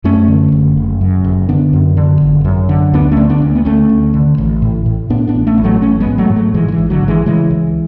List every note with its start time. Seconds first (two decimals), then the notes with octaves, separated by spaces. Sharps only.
0.04 F#2 A3 C#4
0.28 D3
0.52 F#1
0.77 F#1
1.01 F#2
1.24 F#1
1.49 D3 B3 D4
1.73 F#2
1.97 D3
2.21 G#1
2.45 F#2
2.69 D3
2.94 D2 B3 D4
3.12 A3 C#4
3.17 D3
3.29 B3 D4
3.42 D2
3.55 B3
3.65 D2 A3 C#4
3.89 D2
4.14 D3
4.38 A1
4.62 A2
4.86 A2
5.10 A2 B3 D4
5.27 B3 D4
5.34 A1
5.47 A3 C#4
5.58 A1
5.64 F#3 A3
5.82 A1 A3 C#4
6.00 G#3 B3
6.06 G#2
6.18 F#3 A3
6.30 G#2
6.36 F#3 A3
6.54 G#2 E3 G#3
6.68 D3
6.72 E3
6.78 A1
6.90 D3 F#3
7.03 A1
7.08 E3 G#3
7.26 C#3 E3 G#3
7.50 C#2